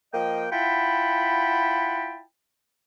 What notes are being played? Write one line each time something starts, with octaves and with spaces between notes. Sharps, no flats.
F3 A#3 D#5 G5
E4 F4 F#5 G5 A5 B5